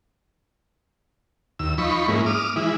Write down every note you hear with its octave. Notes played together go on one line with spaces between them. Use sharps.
D#2 E6
F3 D#4 B5 C#6
G#2 G#3 A#3 C#4 E4
D6 D#6 F6
E3 G#3 E4